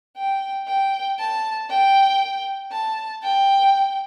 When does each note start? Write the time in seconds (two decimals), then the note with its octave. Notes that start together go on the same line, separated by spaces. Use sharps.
0.17 G5
0.68 G5
1.18 A5
1.70 G5
2.71 A5
3.23 G5